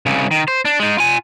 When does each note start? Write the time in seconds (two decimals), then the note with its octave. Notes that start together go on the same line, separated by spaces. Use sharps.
0.06 C2 C#3
0.31 D#3
0.48 C5
0.65 D4
0.80 G#3 D#4
0.98 F4 G#5